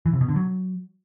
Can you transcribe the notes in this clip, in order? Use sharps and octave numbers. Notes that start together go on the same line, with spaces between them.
E3
C3
B2
D3
F#3